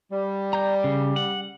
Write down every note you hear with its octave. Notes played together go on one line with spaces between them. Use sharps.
G3
A#5 G6
C#3
F#5